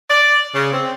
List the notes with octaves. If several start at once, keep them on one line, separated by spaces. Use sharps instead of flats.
D5
C#3
C4